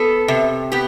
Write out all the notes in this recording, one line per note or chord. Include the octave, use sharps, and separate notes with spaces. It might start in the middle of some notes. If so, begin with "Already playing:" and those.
Already playing: B3 A4
C3
B3 G4